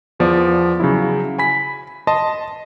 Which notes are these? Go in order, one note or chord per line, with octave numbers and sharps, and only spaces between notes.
E2 F3 B3 D5
C#3 F#3 E4
G#5 B5 B6
D#5 A5 C6